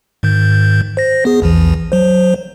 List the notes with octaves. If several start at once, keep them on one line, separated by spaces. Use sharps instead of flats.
G#2 D#3 G6
C5 A#6
B3 G#4
A#1 E2 E3
F#3 C5